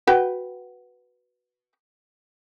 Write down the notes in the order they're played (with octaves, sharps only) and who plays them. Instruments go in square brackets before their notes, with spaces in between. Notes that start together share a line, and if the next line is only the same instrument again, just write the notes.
[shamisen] F#4 B4 G5